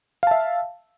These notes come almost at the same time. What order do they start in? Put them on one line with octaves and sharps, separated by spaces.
F5 A5 E5